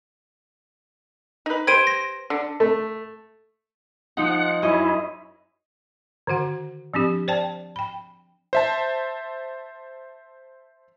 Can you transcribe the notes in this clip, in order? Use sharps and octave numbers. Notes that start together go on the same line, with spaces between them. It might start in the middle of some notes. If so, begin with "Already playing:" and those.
D#4 B4
G4 B4 C5 G#6 D7 D#7
A#6
D3
A3
F3 D#4 F#5
F#2 E4 D#5
D3 D#3 F#4 F#5
F3 C4 D4 G4
C5 D5 G5 A5
G5 B5
C5 E5 A5